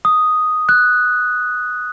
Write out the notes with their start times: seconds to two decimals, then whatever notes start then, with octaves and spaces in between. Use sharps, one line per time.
0.05 D#6
0.69 F#6